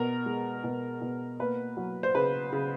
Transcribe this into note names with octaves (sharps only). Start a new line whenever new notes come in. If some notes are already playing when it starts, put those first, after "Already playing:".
Already playing: B2 A#4
G#3
B2
B2
A#3 B4
F#3
C5
C#3 B4
C#3